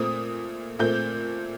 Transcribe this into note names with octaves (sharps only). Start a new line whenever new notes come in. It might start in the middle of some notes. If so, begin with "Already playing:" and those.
Already playing: A#2 A3 C4 D#6
A#2 A3 C4 G6